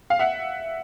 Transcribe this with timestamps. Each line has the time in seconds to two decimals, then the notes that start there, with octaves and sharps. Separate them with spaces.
0.10 F5
0.19 E5 F#5